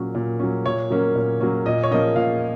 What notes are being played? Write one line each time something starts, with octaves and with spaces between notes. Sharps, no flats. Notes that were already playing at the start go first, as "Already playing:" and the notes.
Already playing: A#2 F#3 C#4
A#2
F#3 C#4
A#2 C#5
F#3 A#3 C#4
A#2
F#3 A#3 C#4
A#2 D#5
C#5
F3 A#3 C#4 D#5
A#2 F5